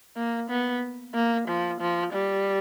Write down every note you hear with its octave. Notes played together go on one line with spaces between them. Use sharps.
A#3
B3
A#3
F3
F3
G3